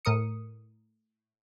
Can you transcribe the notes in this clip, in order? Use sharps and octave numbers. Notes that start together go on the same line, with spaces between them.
A2 A#4 D#6 C#7